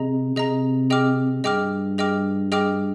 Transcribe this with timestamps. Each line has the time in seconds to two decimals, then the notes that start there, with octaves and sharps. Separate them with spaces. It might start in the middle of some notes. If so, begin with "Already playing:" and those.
Already playing: C3 G#4 D#5 A#5
0.36 C3 G#4 D#5 A#5
0.90 G#4 D#5 G5 D6 F6
1.44 G2 G#4 D#5 G5 D6 F6
1.98 G#4 D#5 G5 D6 F6
2.52 G#4 D#5 G5 D6 F6